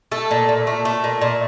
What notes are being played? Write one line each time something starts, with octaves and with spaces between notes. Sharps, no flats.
A3 A4
A#2
A#2
A3
A3
A#2
A#2